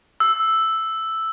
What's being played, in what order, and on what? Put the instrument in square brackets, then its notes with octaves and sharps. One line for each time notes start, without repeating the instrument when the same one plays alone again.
[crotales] E6